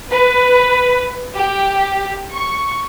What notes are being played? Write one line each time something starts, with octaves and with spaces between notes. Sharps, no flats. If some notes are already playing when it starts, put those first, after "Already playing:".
B4
G4
C#6